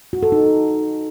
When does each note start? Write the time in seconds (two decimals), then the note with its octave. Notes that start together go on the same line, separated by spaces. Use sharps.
0.13 F#4
0.23 A4
0.32 D#4